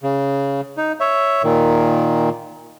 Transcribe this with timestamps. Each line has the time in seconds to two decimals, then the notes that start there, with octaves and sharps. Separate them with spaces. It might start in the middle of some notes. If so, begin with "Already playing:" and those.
0.03 C#3
0.78 D#4
1.00 C#5 E5
1.44 A#2 D#3